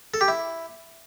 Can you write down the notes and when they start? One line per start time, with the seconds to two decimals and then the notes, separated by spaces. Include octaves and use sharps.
0.14 A4
0.21 G4
0.28 E4